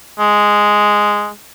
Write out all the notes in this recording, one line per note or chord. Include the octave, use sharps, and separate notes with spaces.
G#3